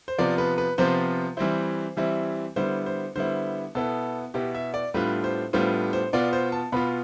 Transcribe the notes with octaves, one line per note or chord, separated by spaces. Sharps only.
C5
C3 F3 B3 F4 D5
B4
B4
C3 F3 B3 F4 C5
E3 G3 C4 E4 C5
E3 G3 C4 E4
D3 G3 B3 E4 C5
C5
D3 G3 B3 E4 C5
B2 B3 E4 A4
B2 B3 E4 G4
E5
D5
A2 G3 B3 D4 F4 B4
C5
A2 G3 B3 D4 F4 C5
C5
B2 B3 F4 D5
C5
A5
B2 B3 F4 B5